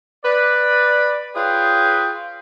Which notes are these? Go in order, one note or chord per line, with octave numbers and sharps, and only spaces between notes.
B4 D5
F4 G#4 B4 C#5 F5 G5